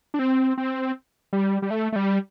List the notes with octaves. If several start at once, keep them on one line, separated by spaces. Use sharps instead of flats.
D4
C4
C4
G3
G3
A3
A3
G3